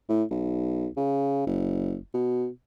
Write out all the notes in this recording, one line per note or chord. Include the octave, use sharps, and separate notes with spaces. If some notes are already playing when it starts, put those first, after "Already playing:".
A2
B1
C#3
F#1
B2